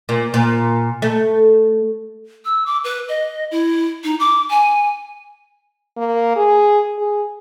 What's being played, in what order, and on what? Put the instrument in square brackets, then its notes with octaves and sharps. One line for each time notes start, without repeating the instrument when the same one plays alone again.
[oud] A#2
A#2
A3
[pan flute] E6
D6
B4
D#5
E4
D#4
D6
G#5
[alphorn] A#3
G#4
G#4